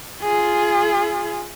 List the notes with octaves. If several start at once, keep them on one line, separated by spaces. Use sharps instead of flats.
F4 G#4